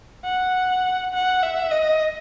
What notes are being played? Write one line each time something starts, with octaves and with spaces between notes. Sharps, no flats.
F#5
F#5
E5
D#5